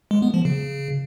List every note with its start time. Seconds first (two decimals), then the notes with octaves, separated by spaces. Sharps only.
0.11 G#3
0.22 B3
0.34 F3
0.45 C#3